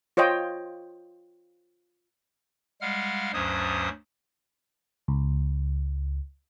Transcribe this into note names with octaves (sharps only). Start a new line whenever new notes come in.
F4 C5 C#5 D#5 G5
G3 G#3 F5 F#5 F6
D2 G2 F#3 C#4 C5 D#6
C#2